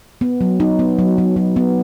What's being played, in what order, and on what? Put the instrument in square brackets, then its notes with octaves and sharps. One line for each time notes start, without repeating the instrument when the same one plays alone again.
[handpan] B3
F#3
D#4
B3
F#3
F#3
F#3
B3